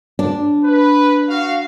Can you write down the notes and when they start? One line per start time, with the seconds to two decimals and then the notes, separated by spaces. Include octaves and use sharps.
0.19 D4
0.64 B4
1.28 F#4 F5